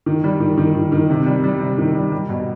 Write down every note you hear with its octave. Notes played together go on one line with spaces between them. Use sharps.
D#3
G3
D#3
D#3
D#3
D#3
C3
G3
G3
C3
D#3
G3
G3
B2